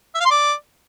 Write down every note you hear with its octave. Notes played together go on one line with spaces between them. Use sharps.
E5
F5
C6
D5